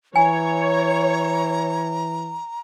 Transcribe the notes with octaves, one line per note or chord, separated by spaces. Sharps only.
E3 C#5 G#5 A#5